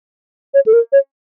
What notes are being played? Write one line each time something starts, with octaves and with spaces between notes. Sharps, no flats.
C#5
A4
A#4
C#5